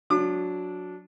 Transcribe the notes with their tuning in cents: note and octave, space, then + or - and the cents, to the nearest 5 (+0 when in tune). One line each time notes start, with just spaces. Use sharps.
F#3 -20 D4 -10 D6 +40